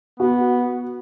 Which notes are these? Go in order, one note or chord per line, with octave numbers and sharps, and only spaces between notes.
B3 F#4